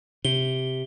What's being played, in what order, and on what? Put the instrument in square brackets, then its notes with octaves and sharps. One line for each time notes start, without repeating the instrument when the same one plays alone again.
[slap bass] C3 [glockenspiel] G7